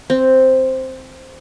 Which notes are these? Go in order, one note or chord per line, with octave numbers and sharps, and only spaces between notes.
C4